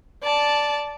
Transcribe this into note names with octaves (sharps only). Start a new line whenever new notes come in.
D5 A5